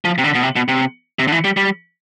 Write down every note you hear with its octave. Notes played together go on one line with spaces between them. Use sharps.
F3
C3
D3
B2
C3
B2
C3
C3
D3
E3
G3
G3